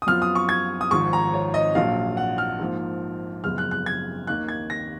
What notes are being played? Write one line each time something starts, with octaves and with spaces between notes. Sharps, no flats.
D#6
F#2 F3 B3 F4 F6
D#6
C#6
G#6
D#6
G#1 G#2 F3 C#6
A#5
C#5
D#5
A#1 A#2 F#3 F5
F#5
F6
G#2 F3 A#3
F#1 F#2 F3 G#3 B3 F6
F#6
F#6
G#6
D#2 D#3 A#3 D#4 F#6
G#6
A#6